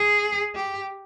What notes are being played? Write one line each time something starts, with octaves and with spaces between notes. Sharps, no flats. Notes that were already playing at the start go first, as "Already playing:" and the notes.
Already playing: G#4
G4